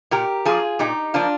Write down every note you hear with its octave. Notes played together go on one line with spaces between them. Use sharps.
A#2 G4 A#4
F3 A#3 F4 G#4
A#2 D#4 G4
F3 A#3 D4 F4